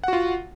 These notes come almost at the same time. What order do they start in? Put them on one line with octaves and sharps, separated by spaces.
F#5 F#4 F4